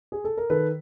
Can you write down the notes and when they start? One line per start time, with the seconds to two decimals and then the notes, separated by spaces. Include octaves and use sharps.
0.12 G#4
0.24 A4
0.37 A#4
0.50 D#3 A4 B4